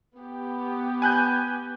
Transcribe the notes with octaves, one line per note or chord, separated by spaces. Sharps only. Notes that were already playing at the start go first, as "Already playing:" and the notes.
B3 G4
G#5 F#6 G6